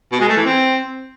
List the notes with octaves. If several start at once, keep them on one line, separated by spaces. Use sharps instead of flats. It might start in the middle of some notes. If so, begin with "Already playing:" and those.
B2
G#3
A3
E3
C4